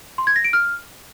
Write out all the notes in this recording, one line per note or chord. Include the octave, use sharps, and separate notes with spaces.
C6
G#6
A#6
D7
F6